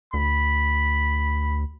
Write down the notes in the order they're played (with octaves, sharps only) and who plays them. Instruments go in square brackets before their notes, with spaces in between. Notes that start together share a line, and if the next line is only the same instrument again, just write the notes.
[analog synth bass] D2 [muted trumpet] B5